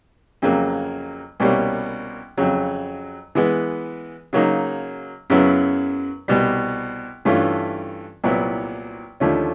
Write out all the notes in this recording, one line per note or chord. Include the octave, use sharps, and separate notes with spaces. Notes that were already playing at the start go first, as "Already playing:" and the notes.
F2 C#3 F#3 A#3
C2 B2 G3 A#3 C#4
F2 C#3 F#3
E3 G#3 B3
C#3 F#3 A#3 D#4
F#2 C#3 F#3 B3 E4
C2 B2 G3
G2 E3 A3 C#4 F4
C2 A#2 F#3 B3 E4
D#2 D3 F3 A3 C#4